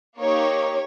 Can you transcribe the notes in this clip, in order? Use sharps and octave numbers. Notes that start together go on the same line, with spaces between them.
A#3 D#4 G4 C#5